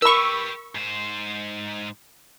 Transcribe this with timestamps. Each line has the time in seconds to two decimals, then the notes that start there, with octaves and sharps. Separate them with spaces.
0.02 G4 A#4 B4 B5 C#6 E6
0.75 G#2 C5